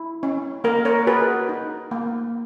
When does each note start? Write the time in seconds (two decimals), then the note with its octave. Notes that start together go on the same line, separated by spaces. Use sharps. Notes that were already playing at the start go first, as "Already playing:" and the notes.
Already playing: E4
0.23 C#4
0.64 A#3 A#4
0.85 A#4 C#5
1.07 F#4 G#4 B4
1.49 D#4
1.91 A#3